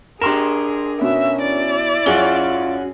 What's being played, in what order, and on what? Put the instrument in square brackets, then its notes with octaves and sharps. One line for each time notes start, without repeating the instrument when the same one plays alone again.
[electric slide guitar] D4 A#4 [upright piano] G4 C6 E7 [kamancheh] G#4
[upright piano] B2 B3 [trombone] C#4 [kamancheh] E5
[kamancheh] E4 D5
[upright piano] F#2 G#4 G7 [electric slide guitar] C#4 F#4 [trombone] F4